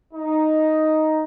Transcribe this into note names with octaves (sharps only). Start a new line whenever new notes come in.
D#4